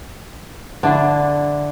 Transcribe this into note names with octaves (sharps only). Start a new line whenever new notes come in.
D3 D4 E4